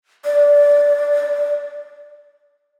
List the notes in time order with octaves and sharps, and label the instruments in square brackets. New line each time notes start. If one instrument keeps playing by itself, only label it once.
[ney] D5